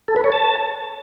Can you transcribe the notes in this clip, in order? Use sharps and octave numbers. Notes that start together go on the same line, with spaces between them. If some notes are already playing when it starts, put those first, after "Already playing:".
A4
B4
C#5
A5